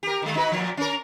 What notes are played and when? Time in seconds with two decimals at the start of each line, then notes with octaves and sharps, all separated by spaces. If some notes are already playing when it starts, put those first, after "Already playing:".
0.03 G4 A#4
0.22 D#3 G#3
0.35 D#4 F#4 B4
0.52 A#2 F3
0.77 C#4 A#4